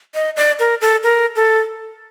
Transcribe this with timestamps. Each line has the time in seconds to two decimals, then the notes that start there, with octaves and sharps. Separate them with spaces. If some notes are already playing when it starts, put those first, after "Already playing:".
0.15 D#5
0.37 D5
0.59 A#4
0.81 A4
1.03 A#4
1.36 A4